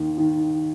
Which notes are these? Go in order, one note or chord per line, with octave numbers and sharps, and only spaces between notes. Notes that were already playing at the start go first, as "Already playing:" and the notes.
Already playing: D#2 D#3
D#3